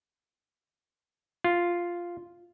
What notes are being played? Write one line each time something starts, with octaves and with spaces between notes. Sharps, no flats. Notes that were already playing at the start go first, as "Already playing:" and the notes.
F4